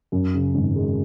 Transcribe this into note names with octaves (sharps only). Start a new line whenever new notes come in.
F#2
C#3
G#1
G#3